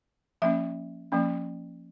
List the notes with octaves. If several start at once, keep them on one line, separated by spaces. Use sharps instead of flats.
F3 A#3 C#4 E5
F3 A#3 C#4